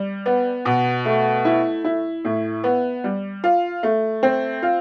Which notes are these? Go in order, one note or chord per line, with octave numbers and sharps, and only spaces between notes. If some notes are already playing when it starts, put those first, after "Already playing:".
Already playing: G3
B3
B2
A3
E4
E4
A2
B3
G3
F4
A3
C4
F4